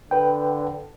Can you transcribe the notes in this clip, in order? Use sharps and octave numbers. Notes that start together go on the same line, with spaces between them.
D3 B4 G5